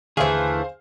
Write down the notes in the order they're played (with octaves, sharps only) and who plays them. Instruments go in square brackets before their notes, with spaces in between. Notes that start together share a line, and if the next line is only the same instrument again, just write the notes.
[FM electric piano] D#2 D3 [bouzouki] E3 A3 [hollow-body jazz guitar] G#4 [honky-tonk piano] C5 F5